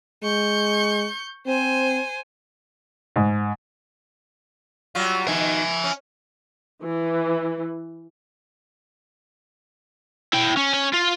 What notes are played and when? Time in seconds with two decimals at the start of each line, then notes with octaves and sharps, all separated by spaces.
0.24 G#3 C#6 G6
1.47 C4 C5 G#5
3.16 G#2
4.95 F#3 G3 F4
5.28 B2 D#3 D#4 E5 G#5
5.84 C#4
6.82 E3
10.33 E4 G5
10.57 C#4
10.74 C#4
10.93 F4